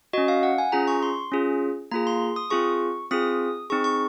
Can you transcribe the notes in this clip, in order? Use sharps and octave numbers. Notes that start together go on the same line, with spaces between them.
C#4 F#4 D#5
F5
F#5
G#5
C#4 F4 G#4 A#5
C#6
C6
C#4 F4 G#4
A#3 F4 G#4 A#5
C6
D#6
C4 F4 G#4 C#6
C4 F4 G#4 D#6
C4 D#4 G#4 C#6
C#6